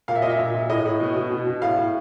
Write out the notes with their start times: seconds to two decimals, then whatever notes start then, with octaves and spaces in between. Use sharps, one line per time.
0.08 A#2 F5
0.15 E5
0.22 A#2 D#5
0.30 E5
0.39 A#2
0.55 A#2
0.69 A2 D#5
0.85 A2
1.00 B2
1.16 B2
1.32 B2
1.47 B2
1.62 A2 F5
1.78 A2